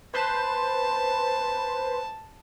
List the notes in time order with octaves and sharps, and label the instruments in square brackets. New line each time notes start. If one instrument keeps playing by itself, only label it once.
[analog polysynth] B4 C5 [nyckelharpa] A5